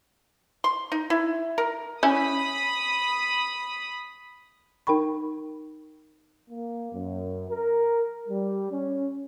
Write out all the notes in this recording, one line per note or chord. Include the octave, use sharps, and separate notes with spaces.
C6
D#4
E4
A#4
C#4 E4 B5 D#6
D#4 A#4 G5 B5 C#6
A#3
F#2
A#4
G3
C#4